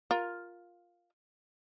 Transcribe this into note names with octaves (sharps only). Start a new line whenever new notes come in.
F4 A#4